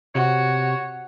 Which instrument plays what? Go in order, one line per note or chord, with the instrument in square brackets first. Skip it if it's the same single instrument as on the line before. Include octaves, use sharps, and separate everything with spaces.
[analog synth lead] C3 [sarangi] F#4 [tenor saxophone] C#5